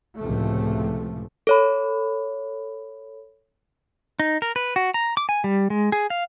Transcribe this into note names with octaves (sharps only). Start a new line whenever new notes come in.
C#2 A2 C3 F3 A3
A4 C#5 B5
D#4
A#4
B4
F#4
A#5
D6
G#5
G3
G#3
G#4
F5